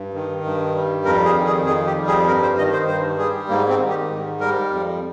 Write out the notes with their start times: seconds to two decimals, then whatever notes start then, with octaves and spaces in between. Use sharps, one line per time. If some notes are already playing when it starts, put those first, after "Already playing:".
Already playing: G2
0.14 D#3
0.44 G2
0.75 G3
1.05 F2 A#4
1.25 G#4
1.35 D#3
1.46 G#4
1.66 F2 G#4
1.87 G4
1.96 G3
2.07 G#4
2.27 G2 A#4
2.42 C5
2.57 D#3 D#5
2.73 C5
2.87 G2 C5
3.18 G3 G#4
3.49 G#2 A#3
3.69 C4
3.80 D#3
3.89 G4
4.10 G#2
4.40 G3 A#4
4.71 F2